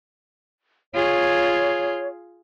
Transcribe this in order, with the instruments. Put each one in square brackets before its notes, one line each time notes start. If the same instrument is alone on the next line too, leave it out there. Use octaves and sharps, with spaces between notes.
[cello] F4 G#4 [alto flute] C#5